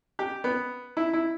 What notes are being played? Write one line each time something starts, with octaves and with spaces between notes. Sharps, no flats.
G4
B3
E4
E4